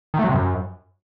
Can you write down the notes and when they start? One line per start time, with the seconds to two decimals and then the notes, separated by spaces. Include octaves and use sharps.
0.14 D#3
0.19 A3
0.24 F#3
0.29 C3
0.34 F#2